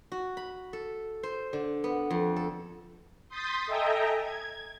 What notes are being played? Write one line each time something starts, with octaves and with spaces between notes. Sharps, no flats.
F#4
B5
A4
C5
D3
B3
F2
A4
C6 D#6 G6 A6 B6
A4 D#5 E5 G5 G#5 A#5
G#6